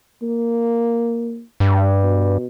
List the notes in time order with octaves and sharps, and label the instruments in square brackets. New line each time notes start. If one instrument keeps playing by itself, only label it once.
[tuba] A#3
[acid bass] G2
[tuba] B2